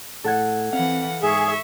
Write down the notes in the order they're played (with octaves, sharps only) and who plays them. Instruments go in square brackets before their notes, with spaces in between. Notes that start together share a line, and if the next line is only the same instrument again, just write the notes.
[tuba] A2 [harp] A4 F#5 G#6
[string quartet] E3 F#5 [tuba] C4 [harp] F5
[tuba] G#2 [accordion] G#4 [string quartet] E5 C#6